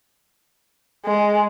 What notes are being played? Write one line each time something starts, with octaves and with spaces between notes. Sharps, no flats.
G#3